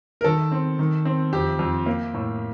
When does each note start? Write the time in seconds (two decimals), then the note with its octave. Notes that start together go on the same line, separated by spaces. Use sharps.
0.21 A#4
0.24 D#3 A4
0.51 C4
0.79 D#3
1.05 C4
1.33 F2 G4
1.59 F2
1.86 A#3
2.14 A2